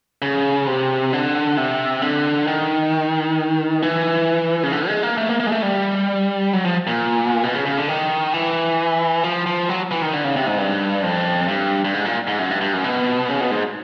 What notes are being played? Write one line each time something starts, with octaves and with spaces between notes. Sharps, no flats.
C#3
C3
D3
C3
D3
D#3
E3
C#3
D3
G#3
A#3
A3
A#3
A#3
G#3
A3
G3
F#3
F3
A#2
B2
C#3
C#3
D3
D#3
E3
F3
F3
F#3
E3
D#3
D3
C#3
C3
G#2
G2
F2
G2
G2
G#2
A#2
G#2
F#2
G2
G2
F#2
B2
C#3
B2
G#2